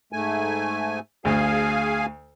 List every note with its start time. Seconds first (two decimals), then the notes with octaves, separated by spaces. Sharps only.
0.13 G#2 A3 G#5
1.25 D2 G#4 F5 G#5